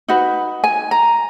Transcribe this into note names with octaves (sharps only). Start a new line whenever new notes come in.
D#4 F#4 B4
G#5
A#5